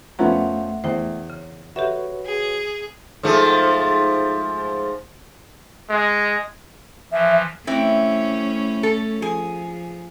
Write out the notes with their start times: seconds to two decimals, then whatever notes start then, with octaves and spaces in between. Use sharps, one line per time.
0.19 F2 F3 A3 B3 C#4 E5 F#5 A#5
0.84 E2 C5 G5
1.30 C#3
1.76 F#4 G4 A4 B4 C#5 E5
2.27 G#4
3.23 G#2 F3 A3
5.90 G#3
7.12 E3 F3 E5
7.67 E3 A3 C4 C#4 E4
8.83 A4
9.22 F3 G#4